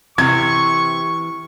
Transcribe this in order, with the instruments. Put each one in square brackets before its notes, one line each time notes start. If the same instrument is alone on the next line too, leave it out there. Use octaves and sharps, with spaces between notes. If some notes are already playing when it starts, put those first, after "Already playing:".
[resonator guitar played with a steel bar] C3 [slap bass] E3 [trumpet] C#6 [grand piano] G#6